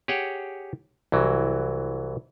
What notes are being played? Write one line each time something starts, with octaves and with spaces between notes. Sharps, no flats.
G4 G#4 C#5 F#5 G5
C2 E3 F#3